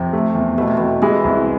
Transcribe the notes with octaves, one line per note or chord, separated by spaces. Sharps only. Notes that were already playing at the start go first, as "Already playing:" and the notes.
Already playing: F2 C3
A3
E2
B2 A3
C3
E2 B2
E3 G#3
C2